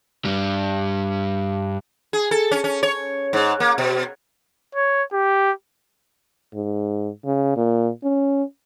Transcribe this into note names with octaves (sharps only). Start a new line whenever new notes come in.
G2 G3
G#4
A4
C#4
C#4
C#5
G#2
A#3
B2
C#5
G4
G#2
C#3
A#2
C#4